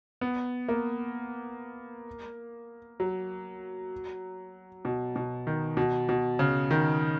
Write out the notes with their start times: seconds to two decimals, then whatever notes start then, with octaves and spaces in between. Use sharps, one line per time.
0.21 B3
0.68 A#3
3.00 F#3
4.85 B2
5.16 B2
5.47 D#3
5.77 B2
6.09 B2
6.39 C#3
6.71 D#3